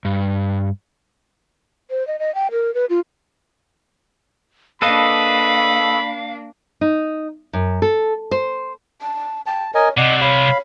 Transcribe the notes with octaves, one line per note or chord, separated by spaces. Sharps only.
G2
C5
D#5
D#5
G5
A#4
B4
F4
A#3 D4 A4 B4 D#5 F5 B5
D#4
F#2
A4
C5
A5
G5 A5
A#4 C#5 D#5 G#5
C2 C3 D5 D#5 F#5 D6
C#5 F5 B5